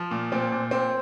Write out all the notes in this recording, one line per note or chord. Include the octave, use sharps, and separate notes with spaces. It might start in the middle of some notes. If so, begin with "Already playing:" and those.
Already playing: F3
A#2
A#2 C4
A#2
A#2 C4